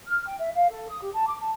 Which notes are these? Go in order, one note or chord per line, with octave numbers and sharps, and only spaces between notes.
F6
G5
E5
F5
A4
D#6
G4
A5
D6
A5